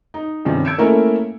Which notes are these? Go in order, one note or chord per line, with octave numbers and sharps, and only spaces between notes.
D#4
G2 C3 D#3 F3 C#4
E6 G#6 C#7 D7 E7
A3 A#3 C#4 E4 A4 A#4